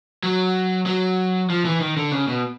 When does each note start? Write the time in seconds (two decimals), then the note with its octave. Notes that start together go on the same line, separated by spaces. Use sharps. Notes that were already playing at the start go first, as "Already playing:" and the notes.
0.23 F#3
0.86 F#3
1.50 F3
1.65 E3
1.81 D#3
1.97 D3
2.12 C#3
2.28 B2